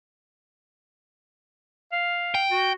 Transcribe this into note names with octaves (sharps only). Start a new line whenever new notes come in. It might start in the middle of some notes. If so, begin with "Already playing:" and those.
F5
G5
F#4